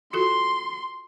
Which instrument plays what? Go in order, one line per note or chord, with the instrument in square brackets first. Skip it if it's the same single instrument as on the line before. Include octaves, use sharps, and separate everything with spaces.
[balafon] F4 F#4 A4 [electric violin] C6